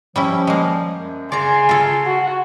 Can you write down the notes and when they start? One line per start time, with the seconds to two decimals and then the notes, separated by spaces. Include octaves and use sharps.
0.16 F3 G3 C#4 E4
0.47 G3 G#3 A#3
0.95 F#2
1.32 C#3 D5 G#5 A#5 C6
1.69 F4 A4
2.05 F#4